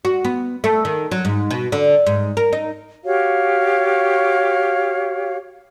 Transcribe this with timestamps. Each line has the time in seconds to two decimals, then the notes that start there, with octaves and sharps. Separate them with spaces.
0.05 F#4
0.25 B3
0.64 A3
0.85 D#3
1.11 F#3
1.25 G#2
1.51 B2
1.72 D3
2.07 G#2
2.37 A#4
2.53 D#4
3.04 F#4 G4 C#5 F5